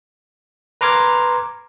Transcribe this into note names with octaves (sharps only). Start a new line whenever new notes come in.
B4 A#5 C6 D6 F6 G#6